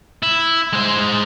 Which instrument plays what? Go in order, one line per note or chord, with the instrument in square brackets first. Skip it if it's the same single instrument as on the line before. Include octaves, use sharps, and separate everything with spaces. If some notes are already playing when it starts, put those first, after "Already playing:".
[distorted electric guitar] E4
G#3 C5